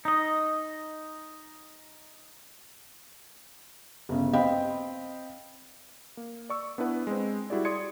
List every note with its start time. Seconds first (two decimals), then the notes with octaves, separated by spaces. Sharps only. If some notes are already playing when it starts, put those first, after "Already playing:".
0.05 D#4 D#5
4.09 G1 C#3
4.33 C4 D#5 F5 G5 B5
6.17 A#3
6.50 D5 C#6 E6
6.78 B3 D4 E4 B4 F#5
7.07 G#3 C4
7.50 G3 E4 F#4 G#4 D5
7.65 D5 C6 D#6 G#6 C#7